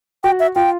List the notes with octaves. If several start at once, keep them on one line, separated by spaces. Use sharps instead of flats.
F#4 G5
E5
F4 G5